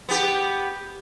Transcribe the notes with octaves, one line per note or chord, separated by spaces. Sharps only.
B3 G4